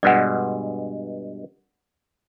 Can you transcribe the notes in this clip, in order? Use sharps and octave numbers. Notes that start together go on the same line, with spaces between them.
G2 B2 G#3 D5 F#5